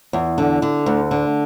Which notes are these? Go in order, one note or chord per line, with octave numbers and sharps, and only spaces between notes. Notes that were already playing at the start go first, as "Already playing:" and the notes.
E2
D3
D3
D2
D3